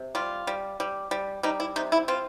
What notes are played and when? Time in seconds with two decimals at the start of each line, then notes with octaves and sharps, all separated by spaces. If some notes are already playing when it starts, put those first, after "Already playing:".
Already playing: C3
0.15 G3 F4
0.47 G3
0.80 G3
1.11 G3
1.43 G3 D#4
1.60 E4
1.76 C3 D#4
1.92 E4
2.08 C4 F4